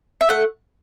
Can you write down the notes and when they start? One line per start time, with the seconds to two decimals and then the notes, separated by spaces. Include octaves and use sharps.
0.21 E5
0.29 A3 F#5